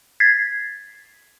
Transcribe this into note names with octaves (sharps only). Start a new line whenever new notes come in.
G#6 A6 B6 C7